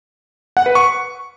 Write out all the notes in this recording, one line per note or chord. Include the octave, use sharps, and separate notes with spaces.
F#5
B4
C#6